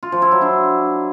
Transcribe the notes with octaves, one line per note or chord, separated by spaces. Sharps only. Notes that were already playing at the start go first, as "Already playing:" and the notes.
F4
F3
E4
F#3
D4